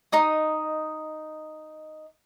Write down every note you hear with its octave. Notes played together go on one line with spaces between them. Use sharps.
D#4 D#5 D#6